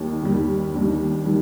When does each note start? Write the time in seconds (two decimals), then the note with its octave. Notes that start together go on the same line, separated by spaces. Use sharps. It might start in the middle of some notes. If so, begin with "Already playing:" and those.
Already playing: D#2 D#3 G3
0.23 D#2 D#3 G3
0.75 D#2 D#3 G3 D4
1.26 D#3 G3